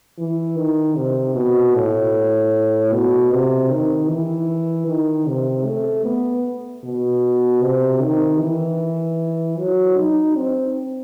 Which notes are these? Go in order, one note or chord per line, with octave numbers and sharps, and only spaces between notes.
E3
D#3
C3
B2
A2
B2
C3
D#3
E3
D#3
C3
A3
B3
B2
C3
D#3
E3
F#3
D#4
C4